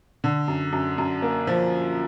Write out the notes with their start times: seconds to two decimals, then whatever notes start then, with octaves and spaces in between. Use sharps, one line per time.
0.24 D3
0.48 F#2
0.73 F#2
0.98 F#2
1.22 A#3
1.47 F3